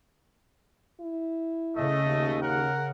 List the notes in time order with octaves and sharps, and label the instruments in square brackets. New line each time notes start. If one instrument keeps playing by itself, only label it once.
[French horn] E4
[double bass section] C#3 [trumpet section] A3 D#5
[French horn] D#2
[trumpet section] A#4 F#5